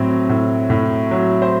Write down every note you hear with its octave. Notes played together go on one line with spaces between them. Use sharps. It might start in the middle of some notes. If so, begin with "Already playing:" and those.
Already playing: A2 F#3 C4
A2
A2
F#3
C5